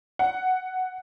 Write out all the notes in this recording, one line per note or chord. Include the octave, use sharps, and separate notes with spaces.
F#5